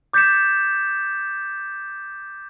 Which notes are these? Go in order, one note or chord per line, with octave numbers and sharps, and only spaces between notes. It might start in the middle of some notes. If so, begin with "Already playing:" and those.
D6 G6 A6 B6 C#7 E7